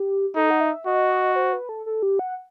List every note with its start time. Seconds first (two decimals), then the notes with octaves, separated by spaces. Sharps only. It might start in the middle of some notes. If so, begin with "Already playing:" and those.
Already playing: G4
0.36 D#4 A4
0.51 F#5
0.61 E5
0.86 F#4 D#5
1.36 C5
1.53 B4
1.69 A4
1.86 A4
2.03 G4
2.19 F#5